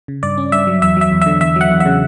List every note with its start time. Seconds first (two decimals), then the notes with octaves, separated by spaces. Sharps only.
0.08 C#3
0.23 G2 D5
0.38 C#4
0.52 G2 E5
0.67 F#3
0.82 E2 E5
0.97 F#3 E5
1.12 E2
1.21 D3 E5
1.41 E2 E5
1.56 F#3 F#5
1.70 E2
1.80 E5
1.86 C#3